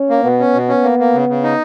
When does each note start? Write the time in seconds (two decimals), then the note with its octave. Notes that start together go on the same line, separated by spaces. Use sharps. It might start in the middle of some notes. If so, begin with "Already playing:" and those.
Already playing: C#4
0.10 A#3
0.24 B2 B3
0.40 C#4
0.54 B2
0.69 C#4
0.83 A#3
0.99 A#3
1.14 C#3
1.29 C#3
1.43 D#4